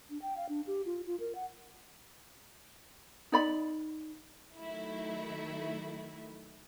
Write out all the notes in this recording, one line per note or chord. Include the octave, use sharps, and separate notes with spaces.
D4
G5
F5
D4
G4
F4
F4
A#4
F#5
D#4 D5 B5
D#3 F#3 A3 E4